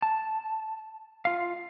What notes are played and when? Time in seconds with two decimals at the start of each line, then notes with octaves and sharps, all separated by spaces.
0.02 A5
1.25 F4 F5